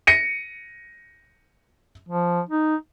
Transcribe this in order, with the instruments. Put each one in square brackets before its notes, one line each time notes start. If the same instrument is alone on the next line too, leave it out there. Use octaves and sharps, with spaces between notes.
[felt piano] A#6 C#7 D#7
[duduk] F3
D#4